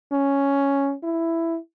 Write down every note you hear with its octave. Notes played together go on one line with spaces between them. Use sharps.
C#4
E4